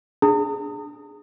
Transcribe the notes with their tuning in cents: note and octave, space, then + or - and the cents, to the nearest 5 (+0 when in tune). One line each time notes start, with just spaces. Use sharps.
D4 +0 G#4 +0 A#5 -45